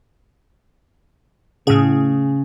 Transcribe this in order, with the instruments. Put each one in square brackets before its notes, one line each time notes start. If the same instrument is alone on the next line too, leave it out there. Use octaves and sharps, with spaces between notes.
[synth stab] A2 G#4 [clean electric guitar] C#3